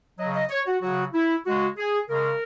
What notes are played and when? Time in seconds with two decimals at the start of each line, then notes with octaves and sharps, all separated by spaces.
0.18 C#3 F#3 D#5
0.34 D#5
0.49 C#5
0.66 F#4
0.81 C#3 F#3 F#4
1.13 E4
1.45 C#3 G#3 F#4
1.77 G#4
2.09 C#3 G#3 A#4